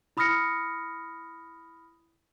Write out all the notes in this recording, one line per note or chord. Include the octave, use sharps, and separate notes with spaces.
E4 B5 D#6 F6 A#6 C#7